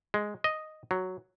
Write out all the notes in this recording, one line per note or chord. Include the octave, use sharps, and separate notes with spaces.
G#3
D#5
F#3